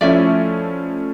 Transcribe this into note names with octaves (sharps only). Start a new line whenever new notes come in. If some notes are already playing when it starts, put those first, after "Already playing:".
F3 A3 C#4 E4 D5 E5